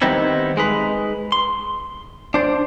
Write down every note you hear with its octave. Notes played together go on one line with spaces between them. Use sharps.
D#3 G3 B3 C4 D#4 E4
G#3 D#4 B4
C6
D4 C5 D5